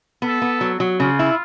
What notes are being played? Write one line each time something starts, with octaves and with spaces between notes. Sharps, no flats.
B3 A4
B3
F#3
F#3
C#3 F4
E4